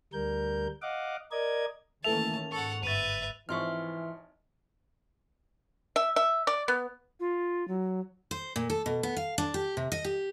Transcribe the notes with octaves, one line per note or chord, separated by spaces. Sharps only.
D2 G3 A#4 G6
D#5 F5 F#5 D6
A#4 D5 D#5 G#6
D#3 E3 A3 A#3 C#4 E5 A5 F7
G#2 A4 F#5 C#6
G1 B4 E5 A6 D#7
G#1 E3 F3 E5 C6 C#6 F6
E5
E5
D5
B3
F4
F#3
C5
A#2
A4
B2
B3
F5
D4
G4
C3
D#5
G4